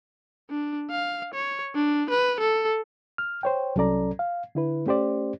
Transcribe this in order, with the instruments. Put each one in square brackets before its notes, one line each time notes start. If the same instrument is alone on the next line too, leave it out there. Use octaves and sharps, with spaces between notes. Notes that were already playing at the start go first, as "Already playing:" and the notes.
[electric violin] D4
F5
C#5
D4
B4
A4
[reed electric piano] F6
C5 C#5 G5
C2 F#3 C#4 A4 D5 A#5
F5
D3 E4 B4
A3 C#4 G4 C5 D5